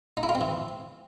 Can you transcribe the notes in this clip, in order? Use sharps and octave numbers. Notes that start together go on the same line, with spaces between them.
D#4
E4
F4
C4
E3